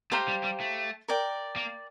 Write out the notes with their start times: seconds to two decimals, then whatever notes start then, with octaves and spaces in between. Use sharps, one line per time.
0.11 A3 G4 C5 F5 A#5
0.28 G3
0.44 G3
0.60 A3
1.08 A#4 D5 G5
1.56 A#3